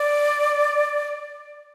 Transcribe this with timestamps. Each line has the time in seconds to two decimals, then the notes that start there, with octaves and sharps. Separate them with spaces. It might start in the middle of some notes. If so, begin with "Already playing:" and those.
Already playing: D5